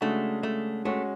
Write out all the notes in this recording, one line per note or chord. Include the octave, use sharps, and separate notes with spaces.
C#3 G#3 A3 D4 F#4
A3
G#3 A3 C#4 F#4